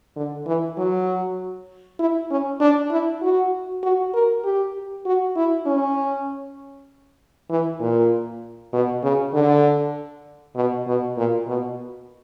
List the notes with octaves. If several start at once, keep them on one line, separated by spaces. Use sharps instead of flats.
D3
E3
F#3
E4
C#4
D4
E4
F#4
F#4
A#4
G4
F#4
E4
C#4
E3
A#2
B2
C#3
D3
B2
B2
A#2
B2